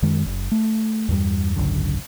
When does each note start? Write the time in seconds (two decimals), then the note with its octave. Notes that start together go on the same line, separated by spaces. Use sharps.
0.02 F#2 D#3 G#3
0.26 F#1
0.51 A3
1.09 E2 G2 G3
1.56 G#1 C#2 F#2 D3